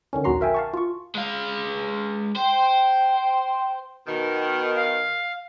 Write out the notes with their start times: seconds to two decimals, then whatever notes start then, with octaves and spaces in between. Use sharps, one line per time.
0.13 D3 D#3 C#4
0.24 A#1 D#2 F#4 A#5 C6 C7
0.41 A#4 E5 G5 G#5
0.54 F5 A5 C#6
0.73 F4 C#6
1.15 G#3 F5
2.35 C5 G5
4.06 B2 D#3
4.77 F5